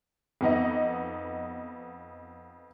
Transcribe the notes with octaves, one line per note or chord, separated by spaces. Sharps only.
F2 B3 D#4 D#5